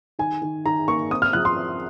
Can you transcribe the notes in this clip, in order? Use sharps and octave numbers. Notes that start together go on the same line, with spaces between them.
D#3 G#5
D#3
D#3 A#5
A#3 C#6
C4 D#6
F6
F3 F#6
C6
C4